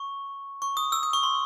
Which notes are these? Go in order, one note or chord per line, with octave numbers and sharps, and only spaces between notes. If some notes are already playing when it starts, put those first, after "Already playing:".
Already playing: C#6
C#6
D#6
E6
D#6
C#6
C6